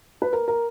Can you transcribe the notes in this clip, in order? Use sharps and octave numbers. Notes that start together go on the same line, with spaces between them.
B4
A#4
A#4